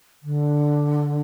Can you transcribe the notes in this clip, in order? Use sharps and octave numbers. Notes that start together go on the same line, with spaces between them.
D3